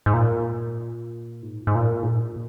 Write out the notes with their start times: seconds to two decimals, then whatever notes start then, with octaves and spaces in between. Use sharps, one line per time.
0.06 G#2
0.14 A#2
1.43 G#2
1.67 G#2
1.75 A#2
2.03 G#2
2.07 A#2